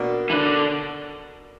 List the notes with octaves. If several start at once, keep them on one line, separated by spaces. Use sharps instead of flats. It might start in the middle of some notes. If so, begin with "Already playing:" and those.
Already playing: B2 A#3 D4 F#4
E3
D3